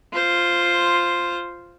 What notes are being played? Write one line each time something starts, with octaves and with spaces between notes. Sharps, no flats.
F4 C5